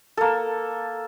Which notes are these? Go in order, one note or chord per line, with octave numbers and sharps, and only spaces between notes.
A#3 A4